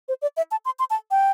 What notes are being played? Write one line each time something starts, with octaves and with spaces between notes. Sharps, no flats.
C5
D5
E5
A5
C6
C6
A5
G5